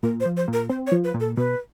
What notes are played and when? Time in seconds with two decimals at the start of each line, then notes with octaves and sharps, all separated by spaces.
0.03 A#2 A#4
0.20 C5
0.25 F3
0.37 C5
0.48 A#2
0.53 A#4
0.70 C4 C5
0.87 C#5
0.92 F3
1.04 B4
1.14 A#2
1.20 A4
1.37 B2 B4